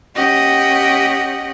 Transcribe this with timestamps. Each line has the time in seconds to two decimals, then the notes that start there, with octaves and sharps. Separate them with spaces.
0.15 C#4 G4 D#5 F#5 G5